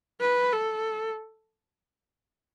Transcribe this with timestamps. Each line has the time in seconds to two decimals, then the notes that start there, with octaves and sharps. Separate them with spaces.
0.21 B4
0.52 A4